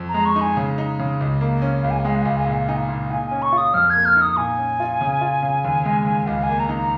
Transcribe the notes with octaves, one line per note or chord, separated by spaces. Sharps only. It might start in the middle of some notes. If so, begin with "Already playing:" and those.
Already playing: F2
A#5
G#3
C#6
D#4
G#5
C#3
D#4
C#3
C#2
A#3
C#4
C#2 F5
G#5
F5
G#3 G#5
F5
G#5
C#2
F5
G#5
A#2 F5
G#5
F5
D#4 G#5
F5
A#2
A#2 G#5
C#4 G#5
C#6
F4
D#6
F2 F6
A#3 G#6
F6
D#4
D#6
A#2 G#5
C#4
F4
C#3
F4
C#3
D#2
G#3
D#2
C#2 F5
G#5
A#3
A#5
D#4
A#5